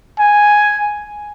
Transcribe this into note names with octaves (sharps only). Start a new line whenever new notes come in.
G#5